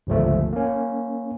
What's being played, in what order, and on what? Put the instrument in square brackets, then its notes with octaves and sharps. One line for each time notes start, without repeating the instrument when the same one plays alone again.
[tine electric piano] G1 C#2 F3 A3
A#3 C#4